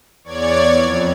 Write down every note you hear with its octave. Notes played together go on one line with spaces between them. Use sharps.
E2 C#5 D5 G#6
F2